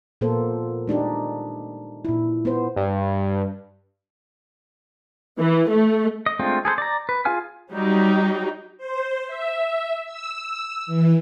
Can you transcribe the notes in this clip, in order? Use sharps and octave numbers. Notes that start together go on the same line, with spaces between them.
A#2 A#3 B3 A4 C5
G#3 D4 D#4 G4
A#2 E4
B3 C5
G2
E3
A3
D#5
G#3 A3 C4 D4 F4
G#4 A4 B4 C5
D5 A#5
B4
F4 G#4 F5 G#5 F6
F#3 G3 D#4 G4
C5
E5
E6
E3